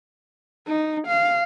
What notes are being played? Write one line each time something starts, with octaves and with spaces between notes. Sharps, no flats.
D#4
F5